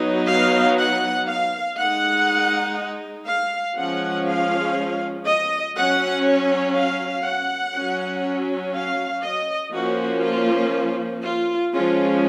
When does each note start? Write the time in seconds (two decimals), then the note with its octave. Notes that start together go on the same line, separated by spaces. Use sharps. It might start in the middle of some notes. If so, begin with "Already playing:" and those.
Already playing: F#3 B3 D#4
0.28 F5
0.78 F#5
1.28 F5
1.78 G#3 D#4 F#5
3.27 F5
3.77 F3 G#3 C#4 F#5
4.27 F5
5.26 D#5
5.76 F#3 C#4 F#5
6.26 C#5
6.75 F5
7.25 F#5
7.76 F#3 C#4
8.75 F5
9.24 D#5
9.73 F3 A#3 C#4 F#4
10.23 F4
11.24 F4
11.73 F3 G#3 C#4 F4